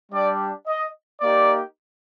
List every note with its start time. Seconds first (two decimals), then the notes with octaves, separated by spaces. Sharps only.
0.12 G3 D4 G4 D5
0.68 D#5
1.21 A#3 D#4 G4 D5